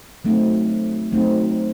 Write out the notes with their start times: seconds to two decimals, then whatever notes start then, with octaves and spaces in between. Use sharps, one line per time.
0.25 F#3 A3 C4 D#4
1.12 F#3 A3 C4 D#4